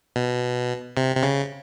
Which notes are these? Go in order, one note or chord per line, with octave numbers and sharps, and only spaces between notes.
B2
C3
C3
C#3